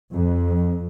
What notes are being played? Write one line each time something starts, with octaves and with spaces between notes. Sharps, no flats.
F2